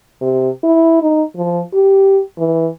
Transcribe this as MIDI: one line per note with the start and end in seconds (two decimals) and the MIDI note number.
0.22 0.49 48
0.63 1.01 64
1.02 1.23 63
1.36 1.60 53
1.73 2.20 67
2.38 2.69 52